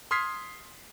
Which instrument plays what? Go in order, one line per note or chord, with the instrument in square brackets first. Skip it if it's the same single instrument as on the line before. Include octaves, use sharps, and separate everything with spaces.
[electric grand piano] C6 D#6 F6 G#6 B6 C7